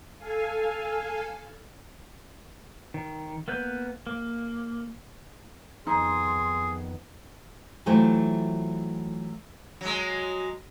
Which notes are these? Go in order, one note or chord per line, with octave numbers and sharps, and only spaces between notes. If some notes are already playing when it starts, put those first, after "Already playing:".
A4 F5 G#5
D#3
A#3 B3 B4 G6
A#3
F2 D#3 B3 D#4 G#4 C6
E3 F#3 A3 F4 G4 C5
F#3 G#3